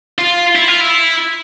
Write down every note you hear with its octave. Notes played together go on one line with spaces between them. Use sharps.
F4
E4
F4
E4